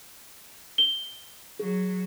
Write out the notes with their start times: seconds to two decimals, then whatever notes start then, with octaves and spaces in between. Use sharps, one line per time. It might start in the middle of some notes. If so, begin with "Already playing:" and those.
0.78 G7
1.59 F#3 G#4